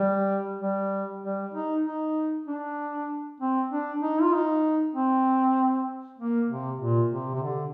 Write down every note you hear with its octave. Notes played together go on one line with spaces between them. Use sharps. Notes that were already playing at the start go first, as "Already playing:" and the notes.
Already playing: G3
G3
G3
D#4
D#4
D4
C4
D4
D#4
F4
D#4
C4
A#3
C3
A#2
C3
C3
D3